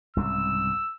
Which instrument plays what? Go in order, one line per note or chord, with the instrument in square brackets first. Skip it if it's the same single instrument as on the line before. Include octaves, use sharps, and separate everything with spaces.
[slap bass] C2 G#2 C#3 [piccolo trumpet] E6